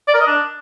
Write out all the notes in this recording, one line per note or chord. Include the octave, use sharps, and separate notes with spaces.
D5
A#4
D#5
D4